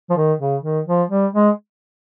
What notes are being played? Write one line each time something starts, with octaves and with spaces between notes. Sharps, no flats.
F3
D#3
C#3
D#3
F3
G3
G#3